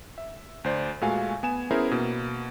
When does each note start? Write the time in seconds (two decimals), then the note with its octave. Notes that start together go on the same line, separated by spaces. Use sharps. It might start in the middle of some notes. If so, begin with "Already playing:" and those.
0.18 E5
0.64 D2 C5 D5
1.01 A#2 G#3 A3 F#4 F5 G#5
1.43 B3 G#5 E7
1.71 B3 C#4 E4 G#4 A#4 C5
1.92 B2 A#3